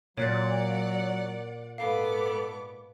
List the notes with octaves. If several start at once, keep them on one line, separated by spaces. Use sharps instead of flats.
A#2 F#3 C#5 D5 F#5 F#6 A6
G#2 B3 A4 F5 D6